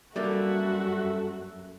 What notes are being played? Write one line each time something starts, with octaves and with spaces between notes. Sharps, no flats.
F#2 G3 A#3 D4 F#4 A4 E5